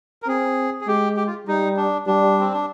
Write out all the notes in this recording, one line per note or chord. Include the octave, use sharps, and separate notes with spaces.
A#4
C4 G#4
G#4
G#3 G4
G4
F4
G3 D#4
D4
G3 D4
C4
D4